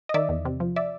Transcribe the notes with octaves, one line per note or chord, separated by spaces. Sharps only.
D#5
D#3 D5 E5
E2
C3
F3
D5 E5